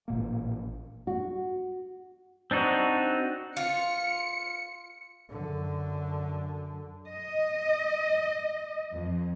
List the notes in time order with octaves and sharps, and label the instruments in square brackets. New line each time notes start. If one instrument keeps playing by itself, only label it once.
[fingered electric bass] A1 A#2 A#3
[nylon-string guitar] F#4
[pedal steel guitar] C4 D4 D#4 F#4
[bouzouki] F4 [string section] C#7
[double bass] F#2 D3
[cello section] D#5
F2